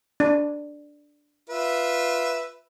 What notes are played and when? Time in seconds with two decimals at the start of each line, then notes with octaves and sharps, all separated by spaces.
0.20 D4
1.49 F4 B4 E5